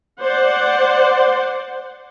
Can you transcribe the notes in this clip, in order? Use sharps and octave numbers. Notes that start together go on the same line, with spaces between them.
C5 D5 F#5